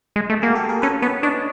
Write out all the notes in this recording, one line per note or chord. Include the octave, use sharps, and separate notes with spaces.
G#3
A3
A#3 F#4 G#4
G4 A4
G#4 A#4
C#4 A4 B4
B3 B4 C#5
D4 C#5 D#5